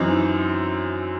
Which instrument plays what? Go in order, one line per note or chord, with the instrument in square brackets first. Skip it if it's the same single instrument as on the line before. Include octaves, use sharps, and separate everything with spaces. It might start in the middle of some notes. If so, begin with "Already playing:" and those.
Already playing: [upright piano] F#2 E3 C4 D#4